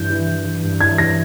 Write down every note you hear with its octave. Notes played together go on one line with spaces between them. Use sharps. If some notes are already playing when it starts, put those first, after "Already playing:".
Already playing: G2 E3 G6
E3
E3
E3
G2
E3 G#6
E3 A#6